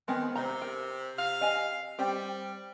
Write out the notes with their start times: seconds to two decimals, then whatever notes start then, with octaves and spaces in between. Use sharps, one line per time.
0.08 D#3 G#3 B3 C4
0.36 C3 A#5
0.62 A#4
1.17 C3 F5
1.41 D#5 G#5
1.99 G3 C4 C5